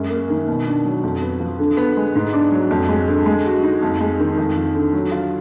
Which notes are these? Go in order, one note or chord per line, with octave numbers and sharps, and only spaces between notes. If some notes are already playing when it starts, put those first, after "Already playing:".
Already playing: F#2 G#3
A#3
D#3
B2
D4
F#3
F2
B3
F3
D3
B3
G#3
G#2
D4
F#3
F2
G#3
D3
G#3
F#4
D#4
F2
G#3
D#3
F2
F3
D3
F#3
F4